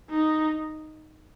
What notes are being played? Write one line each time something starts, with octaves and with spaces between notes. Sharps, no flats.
D#4